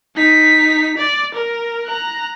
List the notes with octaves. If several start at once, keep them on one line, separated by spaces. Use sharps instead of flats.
D#4 B6
D5
A#4
A#5 F#6